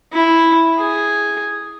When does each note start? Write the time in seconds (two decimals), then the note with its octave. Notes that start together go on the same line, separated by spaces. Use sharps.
0.13 E4
0.79 G#4